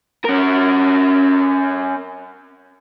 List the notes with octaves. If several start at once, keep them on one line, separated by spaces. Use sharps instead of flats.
C#4 A#4